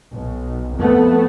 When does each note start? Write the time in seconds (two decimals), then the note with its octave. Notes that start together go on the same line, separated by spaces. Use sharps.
0.14 B1
0.78 F2 A3 B3